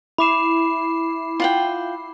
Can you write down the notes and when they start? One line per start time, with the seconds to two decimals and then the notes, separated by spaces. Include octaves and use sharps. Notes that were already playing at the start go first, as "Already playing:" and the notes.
0.18 E4 B5 D6 C7 E7
1.40 F4 F#5 G5